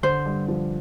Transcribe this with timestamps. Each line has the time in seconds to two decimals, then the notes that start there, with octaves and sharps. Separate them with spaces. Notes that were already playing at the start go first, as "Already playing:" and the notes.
0.03 D3 C5
0.26 G2
0.48 F3